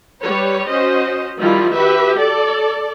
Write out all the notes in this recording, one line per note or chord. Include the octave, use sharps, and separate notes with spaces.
G3 B4 C#5
C#4 F#4 C5 D#5
D#3 F3 G3 E4 F4
F#4 G4 B4 E5
A4 D5